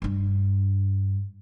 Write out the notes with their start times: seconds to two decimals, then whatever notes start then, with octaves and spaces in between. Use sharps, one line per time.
0.02 G2 D4